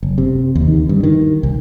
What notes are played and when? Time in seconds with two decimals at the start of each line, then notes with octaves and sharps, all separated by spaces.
0.03 F#1
0.18 C3
0.55 D#2
0.68 D#3
0.89 G2
1.03 D#3
1.43 C2